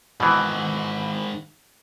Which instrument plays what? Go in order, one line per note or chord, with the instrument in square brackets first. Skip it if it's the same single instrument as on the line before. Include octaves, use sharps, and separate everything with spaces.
[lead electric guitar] G#2 D#3 [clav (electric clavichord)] B2 E3